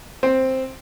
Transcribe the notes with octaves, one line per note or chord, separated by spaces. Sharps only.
C4